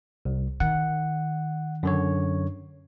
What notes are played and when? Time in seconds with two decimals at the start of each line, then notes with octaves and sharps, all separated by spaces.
0.25 C2
0.60 D#3 F#5
1.83 F#2 D3 C#5